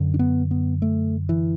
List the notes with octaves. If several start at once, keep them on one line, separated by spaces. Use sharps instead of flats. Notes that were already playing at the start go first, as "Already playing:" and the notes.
Already playing: F#2 D3
D4
B3
B3
A3
E3